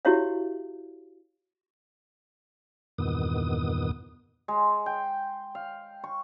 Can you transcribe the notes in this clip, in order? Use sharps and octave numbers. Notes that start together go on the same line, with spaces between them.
E4 F#4 G4 C#5 E5 F5
E2 G2 A#2 D#3 B3 D#6
G#3
G5
F5
C#6